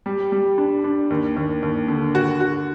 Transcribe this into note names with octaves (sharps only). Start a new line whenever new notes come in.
G3
G3
D4
D4
D#2
D#2
D#2
D3
F#4
F#4